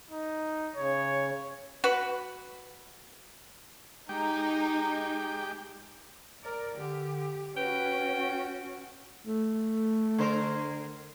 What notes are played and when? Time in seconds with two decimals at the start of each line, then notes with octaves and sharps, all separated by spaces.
0.10 D#4
0.75 C#3 C#5
1.84 F#4 B4
4.09 G#3 D#4 G4 G5
6.43 A#4 D5
6.76 D3 G4
7.57 C#4 F#4 B4 G5
9.27 A3
10.19 D3 A#4 C5